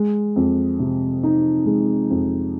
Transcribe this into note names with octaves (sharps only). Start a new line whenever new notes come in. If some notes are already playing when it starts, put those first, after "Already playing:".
Already playing: G#3
F2
C3
D#4
G#3
F2